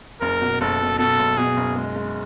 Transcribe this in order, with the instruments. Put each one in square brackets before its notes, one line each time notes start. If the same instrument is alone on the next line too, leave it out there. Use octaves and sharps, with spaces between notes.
[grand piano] F#1 [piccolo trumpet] A#4
[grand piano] B2
[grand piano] F#1 [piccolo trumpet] A4
[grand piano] B2
[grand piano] B2 [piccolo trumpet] A4
[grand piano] F#1
[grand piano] B2 [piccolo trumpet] G#4
[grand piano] F#1
G#3
G#3